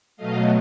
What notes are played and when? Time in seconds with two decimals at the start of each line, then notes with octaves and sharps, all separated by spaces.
0.17 B2 F#3 A3 D#5 F5